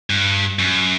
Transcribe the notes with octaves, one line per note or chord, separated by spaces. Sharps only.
G2
F#2